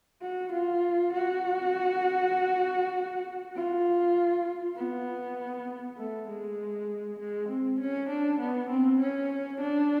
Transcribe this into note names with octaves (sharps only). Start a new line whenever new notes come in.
F#4
F4
F#4
F4
B3
A3
G#3
G#3
C4
C#4
D4
B3
C4
C#4
D4